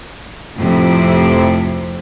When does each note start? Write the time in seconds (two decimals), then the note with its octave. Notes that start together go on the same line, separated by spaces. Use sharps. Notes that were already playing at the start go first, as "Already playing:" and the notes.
0.58 F2 A2 C3 E4